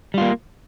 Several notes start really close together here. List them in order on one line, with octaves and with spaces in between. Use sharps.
G3 F4 A#3